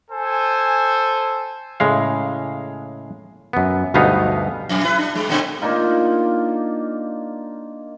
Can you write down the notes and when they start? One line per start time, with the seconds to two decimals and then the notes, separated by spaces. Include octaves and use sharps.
0.11 A4 C5 G#5
1.80 A2 C#3 G#3 F5
3.53 F#2 B3
3.94 D2 G2 B2 B3 D#4 F5
4.69 F2
4.84 E4 B4
4.99 D4
5.15 G2 G#3
5.29 A#2 D3 C4
5.62 A#3 D4 D#4 F4